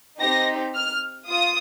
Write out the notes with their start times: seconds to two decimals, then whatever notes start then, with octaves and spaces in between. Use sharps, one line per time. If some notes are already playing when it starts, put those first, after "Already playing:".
0.20 C4 D#4 G4 A#6
0.75 F6
1.28 F4 D#6